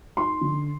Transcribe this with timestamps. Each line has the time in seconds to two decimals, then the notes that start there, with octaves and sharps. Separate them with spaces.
0.17 D#4 C6
0.41 D3